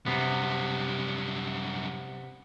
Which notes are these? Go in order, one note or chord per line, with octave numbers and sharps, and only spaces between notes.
F#2 C3 G3 B3